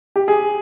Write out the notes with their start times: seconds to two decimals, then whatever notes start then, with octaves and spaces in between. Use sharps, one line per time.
0.16 G4
0.28 G#4